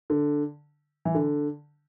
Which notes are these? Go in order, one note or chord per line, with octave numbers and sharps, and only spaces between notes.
D3
E3
D3